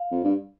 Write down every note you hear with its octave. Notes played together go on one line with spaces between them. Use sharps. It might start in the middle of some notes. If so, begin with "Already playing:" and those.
Already playing: F5
F2
G2